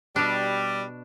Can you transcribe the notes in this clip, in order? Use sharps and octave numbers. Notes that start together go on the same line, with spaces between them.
B2 G3 D4